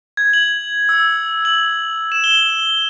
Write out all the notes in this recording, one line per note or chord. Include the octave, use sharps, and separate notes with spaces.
G#6
F#7
E6
F#7
E7
G7